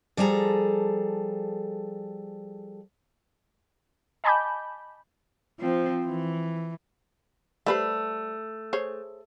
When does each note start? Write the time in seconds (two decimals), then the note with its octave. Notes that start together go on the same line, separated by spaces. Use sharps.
0.17 F3 G3 G#4 A4 A#5
4.24 D#5 G#5 A5 B5 D6 G6
5.60 F3 C4
6.06 E3
7.66 G3 A3 B4 C5
8.73 G#4 C5 C#5